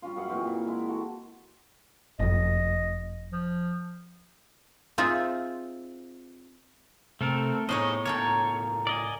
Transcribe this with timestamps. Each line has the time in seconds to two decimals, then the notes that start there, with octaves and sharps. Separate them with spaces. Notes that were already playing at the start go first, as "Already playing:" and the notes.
0.02 G3 C#4 F4
0.16 F#2 G#4 F#5 C#6
0.28 A#2 E3 C4 E4
0.47 E4
0.67 G#3 E4
0.88 F#4 A4
2.19 F#1 F2 D#5
3.32 F3
4.98 C4 D#4 F4 G#4 E5
7.21 C3 A3 C4 A4 A#4
7.69 A2 B3 D#4 G#4 C5 C#5 D#5
8.06 C#2 A2 A#3 A4 C#5 G5
8.87 D5 D#5 G#5